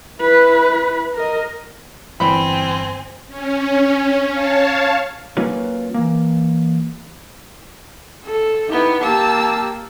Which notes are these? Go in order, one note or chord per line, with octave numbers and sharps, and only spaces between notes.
E4 B4
A#4 D#5
G1 E2 C4 G#5 B5
C#4
C#5 F5 A5
F#3 A#3 C#4 F4 B4 C#5
E3 A#3
A4
B3 D#4 E4 G4
A#3 G4 A5 E6